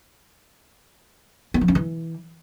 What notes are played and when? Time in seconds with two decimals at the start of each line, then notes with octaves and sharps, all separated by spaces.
1.54 B3
1.61 F3
1.68 C#4
1.75 E3